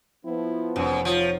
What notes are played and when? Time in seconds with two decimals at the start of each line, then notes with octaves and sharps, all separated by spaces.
0.25 F3 B3 E4
0.76 F1 F#2 C4 D#4
1.05 F3 F4 C#5